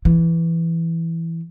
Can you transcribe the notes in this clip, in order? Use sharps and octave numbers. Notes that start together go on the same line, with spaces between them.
E3